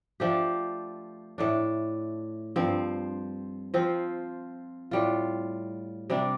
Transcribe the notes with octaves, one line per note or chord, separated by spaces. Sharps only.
F3 A3 D4 G4
A2 A3 D4
G2 F3 C4
F3 C4 F4
A2 G3 F4
C3 G3 D4